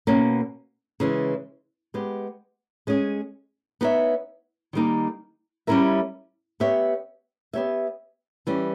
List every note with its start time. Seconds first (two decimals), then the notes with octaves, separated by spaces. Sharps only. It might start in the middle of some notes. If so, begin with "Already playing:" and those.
0.07 B2 A#3 C#4
1.00 C#3 E3 G#3 C#4
1.94 G#3 B3 G4
2.87 G#3 C#4 G#4
3.81 B3 D#4 G4 C#5 E5
4.73 D#3 G3 A#3 D#4 A#4
5.67 G3 C#4 E4 A#4 E5
6.60 B3 G4 C#5 E5
7.53 B3 G4 C#5 E5
8.47 E3 G3 C#4